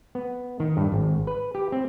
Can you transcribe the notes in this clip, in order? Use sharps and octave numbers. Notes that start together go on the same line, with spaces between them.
B3
D#3
G2
G#1
B4
G4
C4